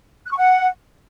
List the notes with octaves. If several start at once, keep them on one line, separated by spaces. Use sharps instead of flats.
F#6
C#6
F#5